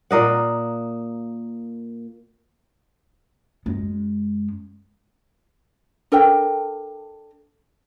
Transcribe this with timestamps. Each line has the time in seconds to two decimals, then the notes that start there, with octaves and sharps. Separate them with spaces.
0.11 A#2 A#3 D#5 F#5
3.66 F#2 G#3
6.12 D4 A4 A#4 G5